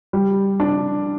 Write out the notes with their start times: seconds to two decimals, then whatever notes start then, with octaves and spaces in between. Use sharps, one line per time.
0.13 G3
0.60 D4